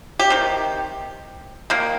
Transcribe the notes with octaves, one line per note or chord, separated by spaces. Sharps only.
G4
C3 D#3
D#3 A#3